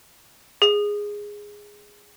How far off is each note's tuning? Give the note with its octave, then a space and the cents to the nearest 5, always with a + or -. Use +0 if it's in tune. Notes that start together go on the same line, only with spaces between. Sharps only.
G#4 -10